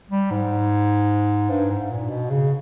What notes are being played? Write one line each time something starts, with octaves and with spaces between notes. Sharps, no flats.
G3
G#2
G2
G#2
A#2
B2
C#3